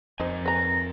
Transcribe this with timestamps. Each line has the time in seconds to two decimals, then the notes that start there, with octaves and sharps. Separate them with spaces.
0.20 F2 D#4 A#4 C5 G#5
0.45 B4 A#5 A#6